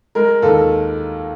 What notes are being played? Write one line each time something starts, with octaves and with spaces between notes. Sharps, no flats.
G#3 A#4
D#2 A4